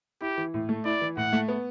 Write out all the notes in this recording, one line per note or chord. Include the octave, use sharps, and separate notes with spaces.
E4 G4
E3
A2
A3
E4 D5
E3
A2 F#5
A3
B3